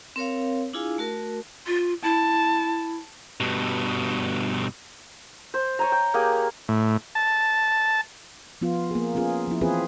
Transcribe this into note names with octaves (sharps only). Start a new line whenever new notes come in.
C4 A#4 C#5 F5
D4 E4 F4 G#4 F5 G#5
A3 F#4 A#4
F4
E4 A5
G2 B2
C5
C#5 G#5 A#5
G5
A#3 G4 G#4
A2
A5
F3 B3 F4
A#3 G#4
B3 C#4 F4 G#4
F3 E4
E3 C4 F4 G#4 B4